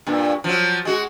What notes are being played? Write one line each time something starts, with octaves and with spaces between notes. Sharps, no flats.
G2 A#2
F3 F#3
G#3 F#4